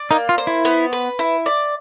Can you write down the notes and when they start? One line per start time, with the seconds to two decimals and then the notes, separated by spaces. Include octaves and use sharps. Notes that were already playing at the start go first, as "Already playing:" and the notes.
Already playing: D5
0.11 A#3 D#4
0.29 F4
0.38 C5
0.47 E4
0.65 B3
0.93 B4
1.19 E4
1.46 D5